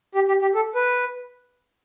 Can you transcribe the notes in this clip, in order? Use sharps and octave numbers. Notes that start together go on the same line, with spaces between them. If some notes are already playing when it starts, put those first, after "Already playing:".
G4
G4
G4
A4
B4